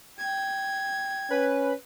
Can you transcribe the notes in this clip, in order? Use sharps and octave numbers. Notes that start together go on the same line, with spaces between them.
G5 G#6
C#4 B4